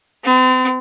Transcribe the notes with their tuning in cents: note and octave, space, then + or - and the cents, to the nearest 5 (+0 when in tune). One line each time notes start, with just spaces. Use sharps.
C4 -40